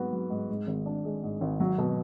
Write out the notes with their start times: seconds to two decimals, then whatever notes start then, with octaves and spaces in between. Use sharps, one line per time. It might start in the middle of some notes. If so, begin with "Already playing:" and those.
Already playing: G#2 F#3 B3 F#4
0.13 F#3
0.30 G#2
0.49 G#2
0.67 G#1
0.86 D4
1.05 G#3
1.23 G#2
1.41 G#1
1.60 F#3
1.78 B2